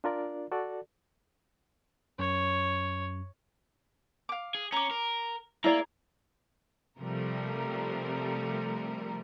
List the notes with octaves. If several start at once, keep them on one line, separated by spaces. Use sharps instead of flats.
D4 F4 A#4 D5
F#4 A4 D5
F#2 C#5
F5 D6
G#4
C#4 A#5 D6
A#4
E4 G#4 A#4 D5 F5 A#5
C3 F3 G3 A3 A#4